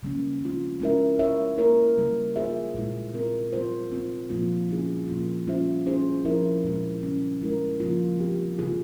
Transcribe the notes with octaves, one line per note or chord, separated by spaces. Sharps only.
C#3 G3 A#3 C#4
E3 G#3 C4 F4
G#3 C#4 E4 A#4 E5
G#3 E4 A#4 C#5 E5
A#3 E4 A#4 C#5
C#3 G3 A#3
A#3 F4 G#4 C5 E5
A#2 G#3 E4
C4 F4 A#4
G3 C4 F4 C5
C4 F4 C5
A#2 F3 A#3 F4
C#3 G3 C#4 E4 G#4
A#2 F3 A#3 F4
G3 C#4 F4 C5 E5
G3 C#4 E4 G#4 C5
F3 C4 E4 A#4 E5
A#2 G#3 E4
C#3 G3 C#4
G#3 E4 A#4
C#3 F3 A#3 F4
G3 C4 G4
C#3 E3 A#3 F4 G#4